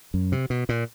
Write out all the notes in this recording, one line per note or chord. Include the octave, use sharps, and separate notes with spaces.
F#2
C3
B2
A#2